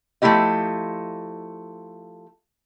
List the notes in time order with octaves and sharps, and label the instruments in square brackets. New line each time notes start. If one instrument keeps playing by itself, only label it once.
[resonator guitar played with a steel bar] F3 A3 C#4 E4 G4 D#5